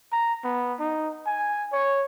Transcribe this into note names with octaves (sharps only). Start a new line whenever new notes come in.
A#5
B3
D#4
G#5
C#5